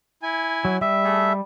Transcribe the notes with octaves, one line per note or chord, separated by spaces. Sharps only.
E4 G#5
F#3
G3 E5
A3 G#4 A4